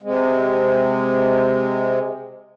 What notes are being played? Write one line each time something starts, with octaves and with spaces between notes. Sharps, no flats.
C3 G#3